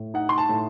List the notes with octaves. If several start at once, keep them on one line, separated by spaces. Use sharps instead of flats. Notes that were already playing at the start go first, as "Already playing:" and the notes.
Already playing: A2
D#4 F#5
C6
A5
A2